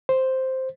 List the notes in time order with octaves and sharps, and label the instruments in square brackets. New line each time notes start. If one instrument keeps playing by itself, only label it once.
[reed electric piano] C5